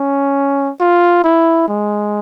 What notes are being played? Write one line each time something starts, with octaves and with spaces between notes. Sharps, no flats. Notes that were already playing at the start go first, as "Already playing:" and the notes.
Already playing: C#4
F4
E4
G#3